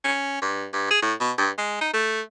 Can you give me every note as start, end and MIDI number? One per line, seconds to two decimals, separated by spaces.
0.04 0.38 61
0.42 0.67 43
0.73 0.87 43
0.91 1.02 68
1.02 1.13 45
1.20 1.32 47
1.38 1.50 43
1.58 1.78 56
1.81 1.89 63
1.93 2.21 57